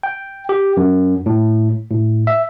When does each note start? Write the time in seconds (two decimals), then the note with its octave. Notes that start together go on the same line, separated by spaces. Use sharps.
0.03 G5
0.49 G4
0.77 F#2
1.26 A2
1.91 A2
2.27 E5